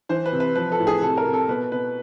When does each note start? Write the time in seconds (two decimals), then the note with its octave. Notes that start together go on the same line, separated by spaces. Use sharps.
0.09 E3 C5
0.26 B4
0.32 C3
0.40 B4
0.55 F3 B4
0.72 A4
0.80 A2
0.87 G#4
1.02 C3 A4
1.17 A#4
1.26 C3
1.33 A4
1.49 B2 B4
1.72 B2 B4